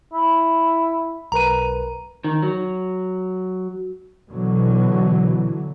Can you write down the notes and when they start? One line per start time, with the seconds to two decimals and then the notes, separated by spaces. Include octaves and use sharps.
0.13 E4
1.32 B1 A#4 B4 A#5 D#7
2.24 D#3
2.42 F#3
4.30 B2 D3 E3 F#3